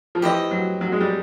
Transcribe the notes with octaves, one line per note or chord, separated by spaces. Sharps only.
F3
E3 G4 C5 D#5
F#3
F#3
G#3
G3